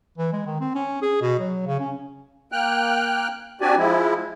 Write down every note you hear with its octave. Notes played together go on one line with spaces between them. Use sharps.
E3
G#3
D#3
C4
C#4
G#4
B2
F#3
C#3
C#4
A#3 G5 F6 F#6
C4 D4 F#4 G4 D5 G#5
F3 G#3 E4